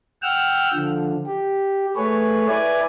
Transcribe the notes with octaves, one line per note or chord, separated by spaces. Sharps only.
F#5 G5 E6 F6
D3 F3
G4
A3 G#4 B4 C#5
E4 B4 D5 G#5